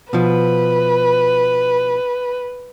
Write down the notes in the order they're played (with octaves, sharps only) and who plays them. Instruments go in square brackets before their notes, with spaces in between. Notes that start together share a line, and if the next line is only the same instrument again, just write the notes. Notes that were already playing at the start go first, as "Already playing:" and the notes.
[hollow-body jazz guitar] B2 F3 [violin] B4